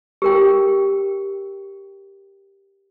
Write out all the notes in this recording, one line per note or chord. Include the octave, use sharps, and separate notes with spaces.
G4 A#4 G5